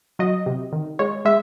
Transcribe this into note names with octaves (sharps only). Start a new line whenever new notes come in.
F#3 D#5
C3
D#3
G#3 C#5
G#3 E5